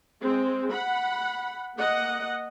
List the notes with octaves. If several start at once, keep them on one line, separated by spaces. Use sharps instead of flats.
G#3 C4
F#5 B5
A#3 D#5 F#5